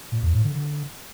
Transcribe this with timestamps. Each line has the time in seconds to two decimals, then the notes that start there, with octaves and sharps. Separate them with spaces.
0.12 A#2
0.23 E2
0.33 A2
0.44 D3
0.55 D3